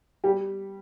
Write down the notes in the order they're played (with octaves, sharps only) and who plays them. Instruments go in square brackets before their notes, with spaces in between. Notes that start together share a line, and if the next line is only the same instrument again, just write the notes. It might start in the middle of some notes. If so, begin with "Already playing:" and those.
[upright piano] G3 G4